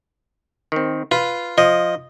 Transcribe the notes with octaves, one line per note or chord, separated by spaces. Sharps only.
D#3 C4
F4 B4
F3 D#5